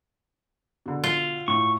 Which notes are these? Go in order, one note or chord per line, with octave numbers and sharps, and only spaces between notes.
B2 D3
F4
A2 C#6